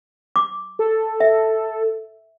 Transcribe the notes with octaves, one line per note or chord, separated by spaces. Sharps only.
D6
A4
E5